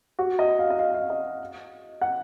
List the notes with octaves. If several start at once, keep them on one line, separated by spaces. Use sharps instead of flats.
F#4
D#5
F5
D#5
F5
F5
D#5
F#5